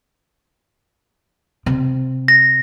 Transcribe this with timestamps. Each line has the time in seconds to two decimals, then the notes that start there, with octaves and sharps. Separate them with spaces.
1.66 C3
2.28 A#6